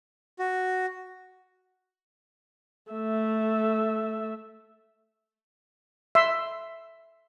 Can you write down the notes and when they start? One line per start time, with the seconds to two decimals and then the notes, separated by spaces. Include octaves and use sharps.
0.39 F#4
2.92 A3 E5
6.15 E5 C6